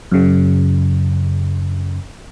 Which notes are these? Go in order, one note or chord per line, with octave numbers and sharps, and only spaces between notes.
F#2 C#3